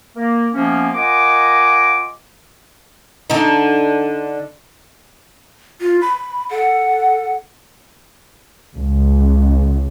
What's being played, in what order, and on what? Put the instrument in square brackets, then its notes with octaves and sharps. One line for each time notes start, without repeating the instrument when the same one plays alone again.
[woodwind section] A#3
C3 F3 A#3 B3 C#4
F4 A#4 D#5 F#5 G#5 D6
[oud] D3 D#4
[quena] F4
B5
[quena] A4 [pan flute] F#5
[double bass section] C#2